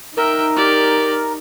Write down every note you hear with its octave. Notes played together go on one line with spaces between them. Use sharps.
D#4 A#4 E5 G5
G4 D5